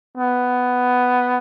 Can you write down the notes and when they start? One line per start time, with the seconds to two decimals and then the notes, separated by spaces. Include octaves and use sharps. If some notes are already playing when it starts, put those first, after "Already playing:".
0.17 B3